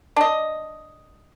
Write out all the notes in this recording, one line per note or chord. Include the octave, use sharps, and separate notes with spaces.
D4 D#5